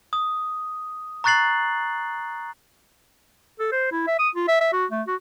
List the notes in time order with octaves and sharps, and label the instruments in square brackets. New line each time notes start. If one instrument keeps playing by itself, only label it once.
[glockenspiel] D#6
A#5 C#6 F#6 A6 C7 F#7
[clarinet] A4
C5
E4
E5
D#6
F4
E5
E5
F#4
A3
F#4